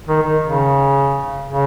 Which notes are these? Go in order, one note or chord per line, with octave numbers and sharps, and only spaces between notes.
D#3
D#3
C#3
C#3